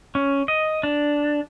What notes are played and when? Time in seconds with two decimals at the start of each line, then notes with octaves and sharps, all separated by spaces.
0.15 C#4
0.48 D#5
0.83 D4